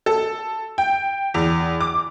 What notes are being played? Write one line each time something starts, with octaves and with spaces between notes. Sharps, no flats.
A4
G5
E2
D6